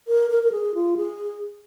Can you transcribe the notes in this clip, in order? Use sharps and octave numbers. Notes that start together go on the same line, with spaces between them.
A#4
A#4
A#4
G#4
F4
G#4